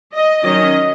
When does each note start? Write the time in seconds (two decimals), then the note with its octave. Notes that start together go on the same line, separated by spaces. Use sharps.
0.12 D#5
0.43 D#3 F#3 C#4 D#5